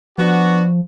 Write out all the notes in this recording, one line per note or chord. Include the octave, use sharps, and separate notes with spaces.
F3 B3 D4 F#4